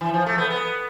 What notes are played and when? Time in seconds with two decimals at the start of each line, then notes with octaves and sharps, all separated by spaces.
0.01 E3
0.14 F3
0.26 A3
0.38 B3
0.50 B3